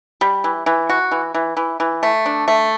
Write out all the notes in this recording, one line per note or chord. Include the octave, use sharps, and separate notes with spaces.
G3
E3
E3
F#4
E3
E3
E3
E3
A3
D4
A3